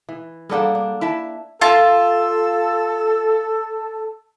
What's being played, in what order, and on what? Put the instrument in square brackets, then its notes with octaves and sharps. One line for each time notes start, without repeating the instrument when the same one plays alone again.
[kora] E3
[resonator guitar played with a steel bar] G3 A4 F#5 [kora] A#3 D4 G#4
[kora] D4
[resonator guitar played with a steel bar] E4 E5 A5
[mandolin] F4 E5 A5 [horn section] A4